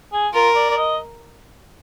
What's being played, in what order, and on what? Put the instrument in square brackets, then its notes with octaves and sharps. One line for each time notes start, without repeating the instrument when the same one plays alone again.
[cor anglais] G#4
[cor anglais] F4 [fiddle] A#4
[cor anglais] D5
D5
D#5